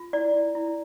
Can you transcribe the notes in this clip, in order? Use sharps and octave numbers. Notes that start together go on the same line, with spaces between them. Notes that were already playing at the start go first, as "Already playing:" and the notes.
Already playing: F4
E4 D5
E4
E4